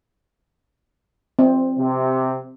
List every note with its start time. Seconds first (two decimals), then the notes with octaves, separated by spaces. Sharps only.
1.39 C4
1.78 C3